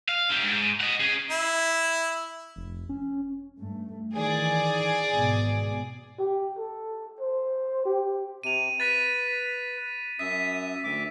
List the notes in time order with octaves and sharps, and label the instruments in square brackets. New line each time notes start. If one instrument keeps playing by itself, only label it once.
[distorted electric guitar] F5
D3 G4
G#2
D#5 F#5
C#4 G#4
[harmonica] E4
[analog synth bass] F1
C#4
[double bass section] G2 A3
[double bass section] D#3 E3 [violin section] G#4 D5
[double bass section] G#1 B2
[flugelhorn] G4
A4
C5
G4
[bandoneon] C3 [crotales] D#7 F7
[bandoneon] B4 [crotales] A6 B6 D#7
[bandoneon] F#2 E5 D#6 [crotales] B6
[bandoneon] D2 E5 D6